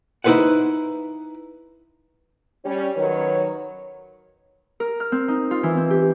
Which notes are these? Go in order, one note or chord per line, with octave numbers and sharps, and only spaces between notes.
D#4 E4 G#4 B4 C5 F#5
G3 C#4
D#3 F#3 A#4 B4 C#5
A#4
F6
C4
D#4
F4
E3
C4
G4